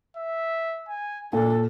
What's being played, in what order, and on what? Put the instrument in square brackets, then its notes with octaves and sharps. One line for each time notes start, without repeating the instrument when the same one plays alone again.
[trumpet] E5
G#5
[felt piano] A#2 [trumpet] D4 [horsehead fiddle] A4